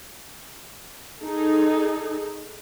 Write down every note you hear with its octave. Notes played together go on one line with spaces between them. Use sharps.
D#4 G#4 A4